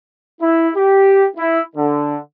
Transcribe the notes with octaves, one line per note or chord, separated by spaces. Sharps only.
E4
G4
E4
D3